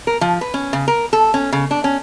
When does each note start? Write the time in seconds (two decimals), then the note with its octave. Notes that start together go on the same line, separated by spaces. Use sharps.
0.07 A#4
0.21 F3
0.41 B4
0.54 C#4
0.73 C#3
0.88 A#4
1.13 A4
1.34 C#4
1.52 C#3
1.71 D4
1.84 C#4